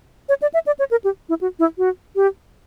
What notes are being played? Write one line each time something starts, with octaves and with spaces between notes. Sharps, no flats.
C#5
D5
E5
D5
C#5
A#4
G4
E4
F#4
E4
F#4
G4